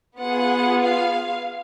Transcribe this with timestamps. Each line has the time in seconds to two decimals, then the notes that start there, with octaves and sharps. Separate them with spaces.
0.18 B3 F4 G#4 F#5
0.81 F5